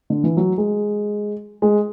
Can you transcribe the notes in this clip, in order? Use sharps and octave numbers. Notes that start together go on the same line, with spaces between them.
D3
E3
F#3
G#3
G#3